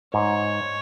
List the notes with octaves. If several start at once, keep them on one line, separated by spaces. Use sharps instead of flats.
G#2 C#5